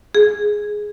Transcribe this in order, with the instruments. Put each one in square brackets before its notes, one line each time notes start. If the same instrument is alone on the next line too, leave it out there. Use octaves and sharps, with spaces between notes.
[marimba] G#4